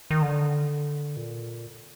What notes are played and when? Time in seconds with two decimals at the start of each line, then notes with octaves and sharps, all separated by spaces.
0.11 D#3
0.22 D3
1.17 A#2